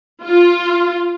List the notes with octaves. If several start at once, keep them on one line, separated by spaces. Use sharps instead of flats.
F4